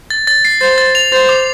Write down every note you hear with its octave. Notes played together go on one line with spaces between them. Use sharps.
A6
A6
C7
C5 A6
A6
F7
C5 A6
D6